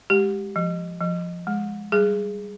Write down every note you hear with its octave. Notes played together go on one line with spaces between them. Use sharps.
G#3 G4
F3
F3
G#3
G3 G#4